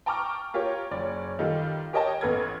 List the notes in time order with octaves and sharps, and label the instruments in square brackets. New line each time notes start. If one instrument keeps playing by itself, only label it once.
[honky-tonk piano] G5 A5 A#5 C#6 D6 F6
F4 G4 A#4 C#5
F#1 C#5 D5
D#3 G3 F4 A4
G4 A#4 C#5 D#5 G5 A5
A1 B3 A4 B4 F6 G#6